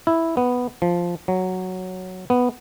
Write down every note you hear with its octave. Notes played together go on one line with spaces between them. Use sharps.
E4
B3
F3
F#3
B3